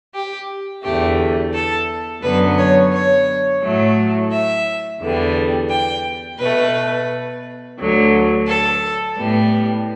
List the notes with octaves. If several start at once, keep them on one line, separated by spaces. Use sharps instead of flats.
G4
E2 D3 A3 G4
A4
F#2 D3 F#3 B3 B4
C#5
C#5
A2 F#3 A3
E5
E2 D3 G3 B3
G5
B2 A3 B4
D2 D3 F#3
A4
A2 G3 B3